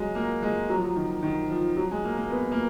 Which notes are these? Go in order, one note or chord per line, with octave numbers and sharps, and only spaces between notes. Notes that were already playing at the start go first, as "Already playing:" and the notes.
Already playing: F#3 G#3
A#3
G#3
F#3
F3
F#3
D#3
D#3
F3
F#3
G#3
A#3
A#3
B3
A#3